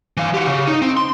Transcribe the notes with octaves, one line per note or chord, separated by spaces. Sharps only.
E3 F5
F#4 G4
C#3
D#4
C4
C6